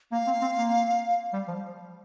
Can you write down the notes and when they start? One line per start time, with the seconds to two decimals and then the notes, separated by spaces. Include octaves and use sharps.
0.12 A#3 F5
0.27 C4
0.42 C4
0.58 A#3
1.33 G3
1.48 F3